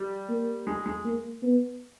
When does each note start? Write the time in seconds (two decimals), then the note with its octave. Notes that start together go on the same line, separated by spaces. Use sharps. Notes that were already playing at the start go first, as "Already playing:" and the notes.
Already playing: G3
0.29 A#3
0.67 G#3
0.86 G#3
1.05 A#3
1.43 B3